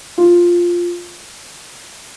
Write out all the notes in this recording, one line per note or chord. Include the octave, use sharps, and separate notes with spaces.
F4